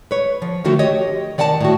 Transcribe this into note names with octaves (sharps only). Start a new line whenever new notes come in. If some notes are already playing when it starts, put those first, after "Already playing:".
B4 C#5
F3
D3 D#3 F3 A3 F#4
G4 C#5 D#5
D#3 D5 F#5 G#5 A5
A2 F#4